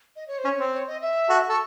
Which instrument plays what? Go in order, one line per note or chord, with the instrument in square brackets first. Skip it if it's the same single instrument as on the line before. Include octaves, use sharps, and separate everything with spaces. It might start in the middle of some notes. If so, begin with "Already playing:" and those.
[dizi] D#5
C#5
C5
[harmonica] C#4
[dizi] C#5
[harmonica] C4
[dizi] C#5
D#5
E5
[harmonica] F#4 A4
[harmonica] A4 [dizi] C#6